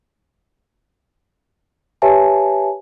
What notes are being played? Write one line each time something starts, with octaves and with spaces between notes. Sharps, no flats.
G4 B4 C#5 E5 G#5 A5